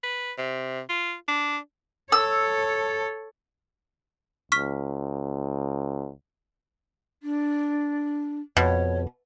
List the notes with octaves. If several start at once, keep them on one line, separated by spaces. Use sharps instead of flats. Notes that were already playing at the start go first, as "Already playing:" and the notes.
B4
C3
F4
D4
A4 C#5 E6
C#2 C#6 F6 B6
D4
F2 B2 C#5